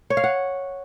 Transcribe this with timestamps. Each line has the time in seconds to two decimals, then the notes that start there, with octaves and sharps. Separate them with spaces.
0.10 C#5
0.17 F5
0.24 F#5